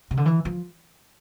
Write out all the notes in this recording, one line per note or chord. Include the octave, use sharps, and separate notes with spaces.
C3
D3
E3
F3